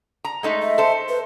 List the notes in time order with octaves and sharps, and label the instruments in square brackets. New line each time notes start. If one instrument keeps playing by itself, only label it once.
[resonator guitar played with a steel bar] A#5
G#3 A3 D#4
[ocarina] E5
[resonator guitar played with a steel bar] A4 C5
[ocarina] B4